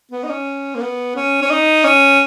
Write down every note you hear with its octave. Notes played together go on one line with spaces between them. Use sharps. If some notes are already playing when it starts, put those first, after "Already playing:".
B3
D#4
C#4
A#3
B3
C#4
C#4
D#4
C#4